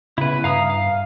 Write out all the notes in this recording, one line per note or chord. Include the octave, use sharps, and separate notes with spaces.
C#3 B3 E4 B4
G2 E5 F5 A#5 D#6
F5